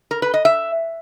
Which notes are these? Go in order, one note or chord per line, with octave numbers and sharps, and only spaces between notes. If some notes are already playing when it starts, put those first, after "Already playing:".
A#4
B4
D#5
E5